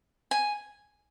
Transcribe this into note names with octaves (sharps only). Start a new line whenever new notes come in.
G#5